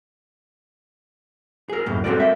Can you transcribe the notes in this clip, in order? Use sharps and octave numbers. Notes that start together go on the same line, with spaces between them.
G#4 A#4
C#2 F#2 A2
G#3 C4 F4 F#4 A4 D5
A#4 E5